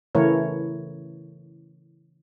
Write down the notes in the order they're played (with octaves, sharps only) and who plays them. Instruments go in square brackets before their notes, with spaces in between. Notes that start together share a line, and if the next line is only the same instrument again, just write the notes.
[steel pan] C#3 E3 A3 E4 A#4 C#5